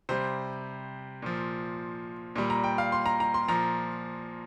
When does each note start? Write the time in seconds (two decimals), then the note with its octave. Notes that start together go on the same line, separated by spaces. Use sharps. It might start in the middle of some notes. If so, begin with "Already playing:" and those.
0.09 C3 G3 C5
1.22 A#2 F3
2.36 A#2 G3
2.50 A#5
2.64 G5
2.78 F5
2.92 C6
3.06 A#5
3.20 A#5
3.34 C6
3.48 A#2 F3 A#5